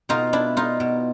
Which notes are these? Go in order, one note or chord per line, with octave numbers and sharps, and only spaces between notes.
B2 D#4 F4
D4 E4
D#4 F4
B2